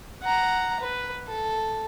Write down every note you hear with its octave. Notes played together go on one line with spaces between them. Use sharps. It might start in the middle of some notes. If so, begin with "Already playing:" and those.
F#5 A#5
B4
A4